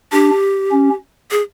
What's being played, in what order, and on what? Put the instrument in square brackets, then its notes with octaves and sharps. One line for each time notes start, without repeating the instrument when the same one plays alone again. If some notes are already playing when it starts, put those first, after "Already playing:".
[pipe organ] D4 [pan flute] G4
[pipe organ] C#4
[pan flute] G#4